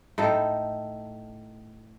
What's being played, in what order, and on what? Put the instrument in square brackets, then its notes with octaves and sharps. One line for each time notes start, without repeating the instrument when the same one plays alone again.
[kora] A2 D#4 A4